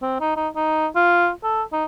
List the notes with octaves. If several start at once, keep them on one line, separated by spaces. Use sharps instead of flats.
C4
D#4
D#4
D#4
F4
A4
D#4